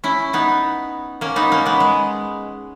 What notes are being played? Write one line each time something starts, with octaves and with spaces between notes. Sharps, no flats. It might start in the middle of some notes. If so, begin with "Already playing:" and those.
C#4 E4
B3 D#4
A#3 C#4
B3 D#4
A#3 C#4
G#3 B3
G#3